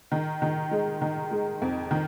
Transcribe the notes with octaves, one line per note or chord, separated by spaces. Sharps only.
D#3
D#3
G#3
D#3
G#3
F2
D#3